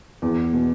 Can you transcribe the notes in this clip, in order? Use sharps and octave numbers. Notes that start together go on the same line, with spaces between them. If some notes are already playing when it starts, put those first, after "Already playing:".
E2
B2